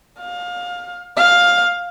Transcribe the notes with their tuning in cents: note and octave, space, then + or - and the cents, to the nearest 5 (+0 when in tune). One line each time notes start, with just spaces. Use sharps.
F5 +25
F5 +10